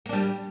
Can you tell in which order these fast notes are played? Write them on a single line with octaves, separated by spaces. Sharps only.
A#3 D4 G3